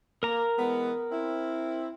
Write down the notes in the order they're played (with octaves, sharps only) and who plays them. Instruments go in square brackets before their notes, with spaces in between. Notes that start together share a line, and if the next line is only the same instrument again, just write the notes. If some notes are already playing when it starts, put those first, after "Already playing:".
[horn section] A#3 [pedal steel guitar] A#4 A#5
[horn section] E3 G#3 B3
C4 E4